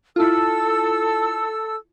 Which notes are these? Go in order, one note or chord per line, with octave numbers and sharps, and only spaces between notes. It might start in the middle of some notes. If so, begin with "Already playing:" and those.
E4 F4 A4 E6